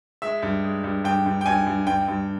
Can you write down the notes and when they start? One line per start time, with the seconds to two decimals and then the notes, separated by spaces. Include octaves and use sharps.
0.22 G#3 E5
0.42 G2
0.64 G#3
0.84 G2
1.04 G2 G5
1.26 G2
1.41 G5
1.46 G2 G#5
1.66 G2
1.87 G2 G5
2.08 G2